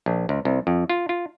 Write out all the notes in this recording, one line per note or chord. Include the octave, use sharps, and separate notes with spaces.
A#1
C#2
C2
F2
F4
F4